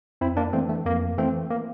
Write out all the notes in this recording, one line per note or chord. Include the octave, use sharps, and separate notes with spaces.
F2 C4 E4
A#3 D4
E3 A3 C4
A3
F2 A#3
E3 A3 C4
A#3